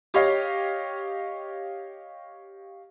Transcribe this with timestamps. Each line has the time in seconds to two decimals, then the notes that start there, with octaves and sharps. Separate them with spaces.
0.14 G4 C#5 D#5 F5